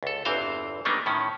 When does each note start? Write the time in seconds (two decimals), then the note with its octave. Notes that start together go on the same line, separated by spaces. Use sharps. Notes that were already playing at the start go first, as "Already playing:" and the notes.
0.03 C#2 A4
0.25 G1 E2 E3 C4 C5 F5
0.85 F#3 G3 A#3 B3 D4 D#4
1.06 A2 D#3 C#4